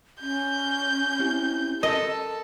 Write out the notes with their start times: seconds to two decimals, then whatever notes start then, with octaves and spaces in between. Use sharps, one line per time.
0.21 C#4 G6
1.19 C4 E4 G4
1.83 A4 A#4 D#5